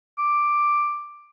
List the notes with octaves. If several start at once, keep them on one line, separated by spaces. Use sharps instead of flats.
D6